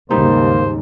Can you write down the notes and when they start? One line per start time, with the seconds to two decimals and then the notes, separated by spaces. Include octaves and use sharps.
0.11 D#2 G#2 C#3 G3 A#3 D#4 C5